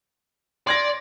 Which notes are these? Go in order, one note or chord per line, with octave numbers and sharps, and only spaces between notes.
D5 C6 G#6 A#6